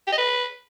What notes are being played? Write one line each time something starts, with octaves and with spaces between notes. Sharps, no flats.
G4
D#5
B4